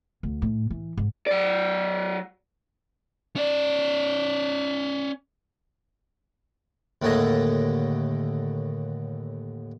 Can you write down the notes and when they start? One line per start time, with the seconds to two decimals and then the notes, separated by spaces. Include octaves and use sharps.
0.23 D2
0.42 A2
0.70 E3
0.97 G#2
1.27 F#3 D5
3.36 C#4 D5
7.02 D#2 A2 D3 A3 G#4 D#5